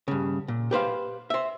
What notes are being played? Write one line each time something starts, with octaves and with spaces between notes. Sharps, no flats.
G2 C#3
A#2
G4 B4 C5 F5
C5 E5